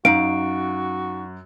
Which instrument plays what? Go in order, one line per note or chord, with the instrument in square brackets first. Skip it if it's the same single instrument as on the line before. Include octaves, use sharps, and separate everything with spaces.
[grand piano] F#2 [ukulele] D#4 F5 [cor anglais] F#4 [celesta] D7